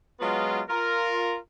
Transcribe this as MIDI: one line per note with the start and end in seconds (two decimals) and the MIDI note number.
0.20 0.61 54
0.20 0.61 56
0.20 0.61 59
0.20 0.61 65
0.69 1.37 65
0.69 1.37 70